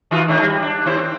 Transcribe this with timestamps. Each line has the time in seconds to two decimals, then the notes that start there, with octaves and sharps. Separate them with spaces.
0.11 D#3 F4 F#4
0.28 G#2 D#3 D4
0.41 G3
0.62 D4
0.85 D#2 E4 C5
0.97 C4